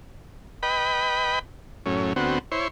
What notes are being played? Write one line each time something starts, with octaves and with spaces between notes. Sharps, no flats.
B4 D#5 G5 B5
F#2 A2 C#4
D2 B3 C4 F#4
E4 C5 C#5